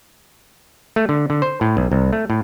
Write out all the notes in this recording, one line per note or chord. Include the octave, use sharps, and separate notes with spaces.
A3
D3
D3
C5
A2
B1
C2
A3
A2